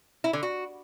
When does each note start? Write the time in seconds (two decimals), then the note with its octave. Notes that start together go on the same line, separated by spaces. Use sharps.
0.24 E4
0.33 D3
0.43 F#4